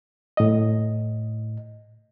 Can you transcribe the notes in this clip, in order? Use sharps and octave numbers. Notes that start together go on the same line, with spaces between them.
A2 D#5